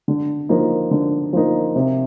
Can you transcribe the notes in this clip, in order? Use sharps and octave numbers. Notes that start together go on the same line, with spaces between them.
D3
F3 A#3 D#4
D3
F3 A#3 D#4
C3